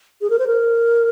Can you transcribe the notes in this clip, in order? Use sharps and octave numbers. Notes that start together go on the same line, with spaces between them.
G#4
A#4
C5
A#4